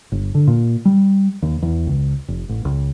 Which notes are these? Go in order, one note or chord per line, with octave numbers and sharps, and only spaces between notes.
G1
D3
A#2
G3
D#2
E2
C#2
F1
A1
C#2